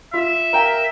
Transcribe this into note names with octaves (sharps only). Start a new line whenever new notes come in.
F4 E5
A#4 F5 G5 G#5